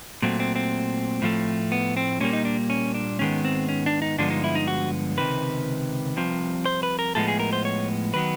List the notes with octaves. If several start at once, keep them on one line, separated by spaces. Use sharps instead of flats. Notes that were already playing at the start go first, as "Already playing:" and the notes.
A#2 F#3 A3 C4
C4
C4
A2 F3 A3
B3
C4
A#2 G3 A#3 C#4
D#4
D4
C#4
D4
G#2 D#3 G#3 B3 C#4
C4
C#4
D4
D#4
G2 D3 F3 G#3 B3 D4
D#4
E4
D#4
F#4
C#2 C3 D#3 B4
C2 C3 F3
C5
B4
A#4
A2 F3 G#3 B3 A4
G#4
A#4
C5
C#5
D#3 F#3 B3 B4